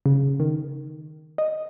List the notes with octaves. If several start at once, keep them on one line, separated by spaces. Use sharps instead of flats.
C#3
D#3
D#5